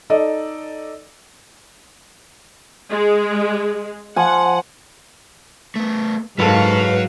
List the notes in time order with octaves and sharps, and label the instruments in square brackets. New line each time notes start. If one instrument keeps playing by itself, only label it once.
[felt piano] D#4 A4 D5 D#5
[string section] G#3
[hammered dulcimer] F3 G#5 [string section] F#5
[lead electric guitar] A3 B3
[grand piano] F#1 A4 [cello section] G#2 F5 [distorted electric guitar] F#3 [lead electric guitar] B4